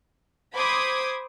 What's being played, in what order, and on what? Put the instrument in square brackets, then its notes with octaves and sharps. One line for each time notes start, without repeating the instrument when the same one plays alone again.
[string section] C5 B5 D6 D#6 G#6